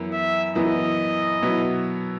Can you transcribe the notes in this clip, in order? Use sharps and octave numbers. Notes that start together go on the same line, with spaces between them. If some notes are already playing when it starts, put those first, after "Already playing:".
Already playing: F#2 E3 B3 E4
E5
F#2 E3 B3 E4 D#5
B2 F#3 B3 E4